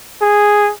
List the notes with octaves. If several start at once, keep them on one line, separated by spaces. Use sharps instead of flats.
G#4